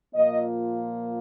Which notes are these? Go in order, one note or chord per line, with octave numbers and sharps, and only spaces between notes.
A#2 F3 A#3 D#5